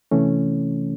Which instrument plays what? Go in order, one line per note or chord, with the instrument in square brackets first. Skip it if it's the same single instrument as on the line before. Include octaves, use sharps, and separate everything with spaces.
[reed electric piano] C3 E3 A3 C#4